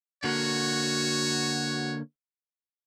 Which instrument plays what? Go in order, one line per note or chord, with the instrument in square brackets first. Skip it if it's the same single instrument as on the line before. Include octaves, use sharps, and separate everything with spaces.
[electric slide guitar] D3 A#3 [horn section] F#4 [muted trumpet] C#5